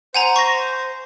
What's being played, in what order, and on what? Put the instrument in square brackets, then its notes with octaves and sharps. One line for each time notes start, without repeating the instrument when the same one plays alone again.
[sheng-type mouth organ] C5 [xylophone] F#5 G#5 A#5
[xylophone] C#6 A#6